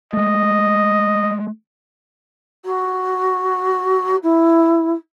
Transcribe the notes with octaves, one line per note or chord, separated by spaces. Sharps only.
G#3 A3 D#5
F#4
E4